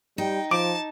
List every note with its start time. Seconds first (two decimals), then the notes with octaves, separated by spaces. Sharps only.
0.18 G3 D#4 G5
0.51 F3 A5 D6